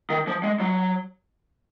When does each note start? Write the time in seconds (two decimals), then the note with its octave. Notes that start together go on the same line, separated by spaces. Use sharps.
0.10 D#3
0.27 F3
0.43 G#3
0.60 F#3